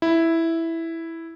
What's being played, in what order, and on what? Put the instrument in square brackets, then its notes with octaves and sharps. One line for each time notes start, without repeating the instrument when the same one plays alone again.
[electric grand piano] E4